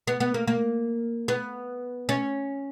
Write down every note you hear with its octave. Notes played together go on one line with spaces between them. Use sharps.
B3
B3
A#3
A#3
B3
C#4